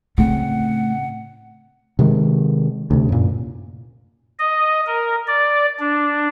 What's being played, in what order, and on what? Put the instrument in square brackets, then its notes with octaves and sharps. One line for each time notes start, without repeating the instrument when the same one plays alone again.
[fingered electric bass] A2 C#3 C4 [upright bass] A3 [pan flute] F#5
[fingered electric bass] C3 D#3 G#3
D2 C3
F#2 A#2
[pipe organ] D#5
A#4
D5
D4